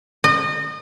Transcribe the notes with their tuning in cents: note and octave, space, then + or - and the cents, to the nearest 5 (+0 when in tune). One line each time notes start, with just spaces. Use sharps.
D#5 -30